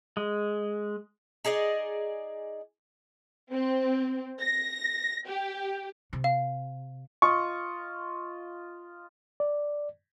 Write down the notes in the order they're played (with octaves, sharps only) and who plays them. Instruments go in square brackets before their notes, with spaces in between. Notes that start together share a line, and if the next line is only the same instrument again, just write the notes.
[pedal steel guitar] G#3
[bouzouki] D#4 G#4 D5 D#5
[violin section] C4
A#6
G4
[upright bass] C3
[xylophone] F5
[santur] F4 D#5 [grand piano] C#6
[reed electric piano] D5